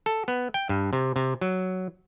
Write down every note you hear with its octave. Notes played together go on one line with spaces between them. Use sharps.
A4
B3
G5
G2
C3
C3
F#3